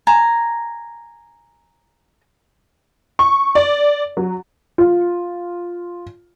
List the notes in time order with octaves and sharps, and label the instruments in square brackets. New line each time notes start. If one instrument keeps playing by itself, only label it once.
[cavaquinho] G#5 A#5
[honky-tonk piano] C#6
D5
F#3
F4